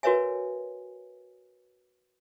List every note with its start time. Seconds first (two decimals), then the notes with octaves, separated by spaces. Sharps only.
0.03 F#4 A#4 B4 C#5 E5 G#5